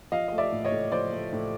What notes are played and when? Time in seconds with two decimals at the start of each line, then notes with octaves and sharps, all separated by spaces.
0.12 F3 D#5 F5
0.28 A3 D#5
0.38 D5 E5
0.52 A2
0.65 C#5 D#5
0.72 A2
0.92 F3 C5 D5
1.13 A3
1.32 A2